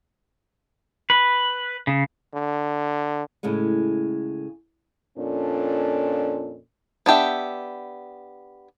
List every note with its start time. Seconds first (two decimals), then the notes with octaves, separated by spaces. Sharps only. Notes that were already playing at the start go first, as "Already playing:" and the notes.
1.10 B4
1.87 C#3
2.34 D3
3.43 A2 C#3 G#3 A3
5.18 F2 A#2 C#4 D4 A4
7.06 B3 D4 G4 E5